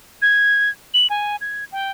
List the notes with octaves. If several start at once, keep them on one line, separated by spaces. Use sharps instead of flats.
G#6
F#7
G#5
G#6
G5